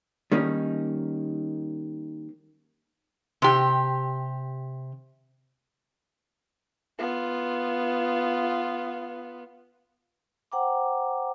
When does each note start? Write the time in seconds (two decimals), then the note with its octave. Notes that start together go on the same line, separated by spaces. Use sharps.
0.32 D#3 G3 A#3 C#4 D#4
3.42 C3 G4
6.98 B3 F4
10.52 C5 F#5 G5 A#5 D6